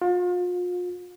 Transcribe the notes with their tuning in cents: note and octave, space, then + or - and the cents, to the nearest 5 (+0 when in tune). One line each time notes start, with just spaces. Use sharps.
F4 +40